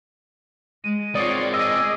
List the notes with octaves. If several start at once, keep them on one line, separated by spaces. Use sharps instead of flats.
G#3 D#7
G#3 C4 F4 C#5 D5 D#6 C7
G#4 D5 D#5 E6